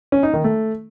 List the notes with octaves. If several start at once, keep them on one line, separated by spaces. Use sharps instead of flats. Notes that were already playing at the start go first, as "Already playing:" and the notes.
C#4
D#4
D#3
A3